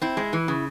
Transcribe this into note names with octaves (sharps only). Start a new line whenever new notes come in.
C4 E4
G#3
E3
C#3